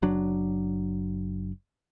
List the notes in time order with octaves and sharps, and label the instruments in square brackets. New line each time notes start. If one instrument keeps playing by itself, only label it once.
[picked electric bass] F#1 F#3 D4